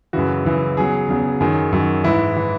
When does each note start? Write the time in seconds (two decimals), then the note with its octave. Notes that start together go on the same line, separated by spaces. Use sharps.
0.13 F#2 C#3 E3 F#4
0.45 F#2 C#3 E3
0.77 E2 C#3 F#3 G#4
1.09 E2 C#3 F#3
1.40 F#2 D#3 F#3 G#4
1.73 F#2 D#3 F#3
2.04 G#2 E3 E4
2.36 E3